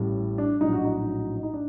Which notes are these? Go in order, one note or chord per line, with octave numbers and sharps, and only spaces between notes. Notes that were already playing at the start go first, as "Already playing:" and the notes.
Already playing: A1 A2 G3
D4
A#1 A2 F#3 D#4
F#4
D#4
D#4
D4